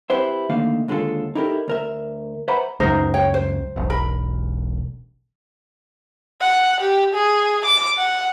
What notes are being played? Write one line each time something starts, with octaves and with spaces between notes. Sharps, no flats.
C4 E4 G4 B4 C5 E5
D2 D3 D#3 A3 A#3 F5
D#2 D3 G#3 F4 A4
D#4 E4 G4 A4 A#4
D2 A#4 E5
B4 C5 E5 F#5 A#5 B5
C#2 F#2 D#4 A#4 C5
C#5 G5
C5
E1 B1
A#4 B5
F#5
G4
G#4
D6
F#5